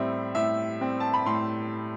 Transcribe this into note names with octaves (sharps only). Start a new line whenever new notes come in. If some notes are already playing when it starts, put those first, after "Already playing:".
Already playing: A2 G3 C4 E5
A2 E5
G3 C4
A5
B5
A2 C6